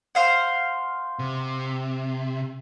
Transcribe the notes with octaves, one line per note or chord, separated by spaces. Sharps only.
C5 F5 F#5
C3